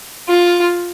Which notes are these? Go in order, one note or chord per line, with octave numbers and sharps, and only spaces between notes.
F4